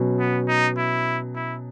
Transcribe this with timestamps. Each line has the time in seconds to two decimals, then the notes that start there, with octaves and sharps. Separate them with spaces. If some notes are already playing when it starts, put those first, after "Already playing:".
Already playing: B2 F#3 C#4
0.19 B3
0.48 D#4
0.78 E4
1.35 E4